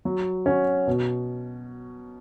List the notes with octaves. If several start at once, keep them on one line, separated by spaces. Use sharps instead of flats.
F#3
C#4 F#4
B2